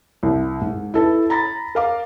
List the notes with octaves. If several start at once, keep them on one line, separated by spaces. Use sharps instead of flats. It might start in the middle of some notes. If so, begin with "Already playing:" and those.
C2
G#2
E4 A4 B4
A#5 B5 A6 A#6
A#4 F5 D6